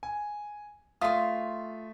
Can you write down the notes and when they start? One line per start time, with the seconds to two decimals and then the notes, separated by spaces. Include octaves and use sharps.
0.03 G#5
1.01 A3 F4 E5 C6 D#6